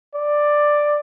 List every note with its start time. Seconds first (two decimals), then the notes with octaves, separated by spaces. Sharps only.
0.15 D5